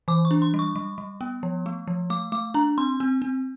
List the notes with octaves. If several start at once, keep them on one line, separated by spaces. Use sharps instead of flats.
E3 D6
C#6
D4
C6
G3
C#6
G3
G3
B3
F3
A3
F3
A3 D6
A3 D6
D4 A#5
C4 C6
C4
C4